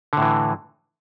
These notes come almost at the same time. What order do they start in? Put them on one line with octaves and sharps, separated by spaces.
D3 A2 E3